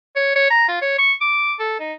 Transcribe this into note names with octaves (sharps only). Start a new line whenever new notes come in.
C#5
C#5
A#5
F4
C#5
C#6
D6
A4
D#4